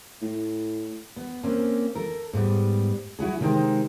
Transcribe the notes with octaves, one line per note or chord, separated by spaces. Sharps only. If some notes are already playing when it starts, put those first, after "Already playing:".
A2
B3
A#3 C4 C#4
A4 A#4
G#2 G3 B3
F#3 E4 F#4 G#4
C3 D#3 G#3 D#4 C5 G5